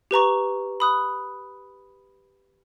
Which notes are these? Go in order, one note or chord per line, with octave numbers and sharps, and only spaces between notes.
G4 B4 A#5 C#6
B5 D#6 F#6